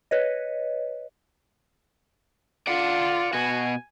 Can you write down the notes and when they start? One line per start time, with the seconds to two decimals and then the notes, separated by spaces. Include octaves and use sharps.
0.11 B4 C#5 D#5
2.67 F4 D5 F#5
3.33 B2 F#4 G#5